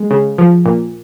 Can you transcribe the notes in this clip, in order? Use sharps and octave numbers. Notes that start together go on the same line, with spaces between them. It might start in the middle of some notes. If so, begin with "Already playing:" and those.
Already playing: G#3
C#3
F3
A#2